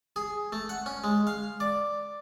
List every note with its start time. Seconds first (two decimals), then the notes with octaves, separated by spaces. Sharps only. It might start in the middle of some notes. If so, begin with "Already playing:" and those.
0.16 G#4
0.53 A3
0.69 F#5
0.86 C#4
1.04 G#3
1.27 F5
1.60 D5